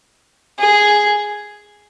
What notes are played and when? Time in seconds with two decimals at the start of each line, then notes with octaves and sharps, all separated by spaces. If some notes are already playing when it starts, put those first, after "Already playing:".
0.59 G#4